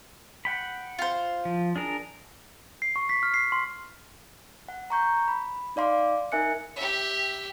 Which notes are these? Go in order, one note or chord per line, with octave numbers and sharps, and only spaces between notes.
F#5 G5 B5
F4 C5
F3
D4 G#4 A#4
C7
C#6
B6
F6
C7
C6
F#5
A#5 C#6 G6
B5
D#4 D5 F5 C6 D6
D#4 A#4 E5 G#5 F#6 C#7
G4 E5